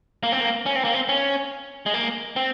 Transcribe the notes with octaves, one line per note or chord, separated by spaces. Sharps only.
A#3
C4
A#3
C#4
C4
A#3
C4
C#4
G#3
A#3
C4